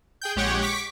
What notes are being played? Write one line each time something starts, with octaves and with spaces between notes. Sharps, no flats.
G#4 G5 G6
A#1 G#3 G4 C#5 F#5 G5
C#6 D6 B6